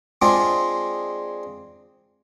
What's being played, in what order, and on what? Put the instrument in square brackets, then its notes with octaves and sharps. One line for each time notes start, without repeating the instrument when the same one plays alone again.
[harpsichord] G#3 C4 D4 F4 G#4 D5